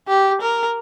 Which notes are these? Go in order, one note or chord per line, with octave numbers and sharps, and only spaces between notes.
G4
A#4